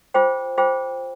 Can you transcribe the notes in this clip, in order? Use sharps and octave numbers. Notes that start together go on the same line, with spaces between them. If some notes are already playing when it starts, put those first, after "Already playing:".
F4 G#4 C5 G5
F4 G#4 C5 G5